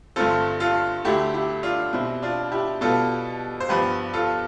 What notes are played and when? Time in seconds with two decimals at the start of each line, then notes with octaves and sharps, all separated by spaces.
0.16 G2 D3 A3 C4 F4 A4
0.60 F4 A4
1.05 D2 D3 A3 E4 G4
1.34 E4 G4
1.63 D4 F4
1.93 B2 G3 C4 E4
2.22 D4 F4
2.52 E4 G4
2.81 B2 G3 B3 F4 A4
3.60 C5
3.69 G2 F3 B3 G4 B4
4.13 F4 A4